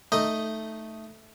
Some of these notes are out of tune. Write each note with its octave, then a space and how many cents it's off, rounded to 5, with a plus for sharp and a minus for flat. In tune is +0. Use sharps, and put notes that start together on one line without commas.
A3 +0 D#4 +0 D#5 +0